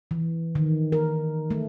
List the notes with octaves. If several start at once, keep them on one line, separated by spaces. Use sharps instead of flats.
E3
D#3
A#4
A3